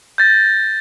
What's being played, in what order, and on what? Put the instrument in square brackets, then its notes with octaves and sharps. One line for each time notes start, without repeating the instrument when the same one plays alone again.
[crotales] G6 A6 A#6